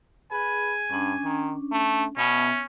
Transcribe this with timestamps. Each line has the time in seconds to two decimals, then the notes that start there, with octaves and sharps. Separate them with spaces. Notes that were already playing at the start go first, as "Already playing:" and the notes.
0.32 G#4 B4 G#5
0.90 G2 C#4 D4
1.24 D#3
1.72 A3
2.18 B2 B3 C#4 E5